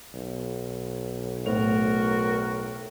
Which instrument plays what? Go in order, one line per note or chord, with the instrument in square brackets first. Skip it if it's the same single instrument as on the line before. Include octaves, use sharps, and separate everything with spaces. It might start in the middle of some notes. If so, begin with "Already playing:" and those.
[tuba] B1
[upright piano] A2 C5 F7 [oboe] F#4 [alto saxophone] A#4